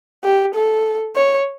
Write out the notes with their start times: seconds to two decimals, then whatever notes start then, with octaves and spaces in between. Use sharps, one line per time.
0.24 G4
0.54 A4
1.16 C#5